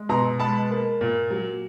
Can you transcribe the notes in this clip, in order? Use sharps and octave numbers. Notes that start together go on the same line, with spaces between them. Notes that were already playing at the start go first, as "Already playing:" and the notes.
Already playing: G#3
B2 A#5 C6
G#3 A5 B5
A#3
A#2
F#3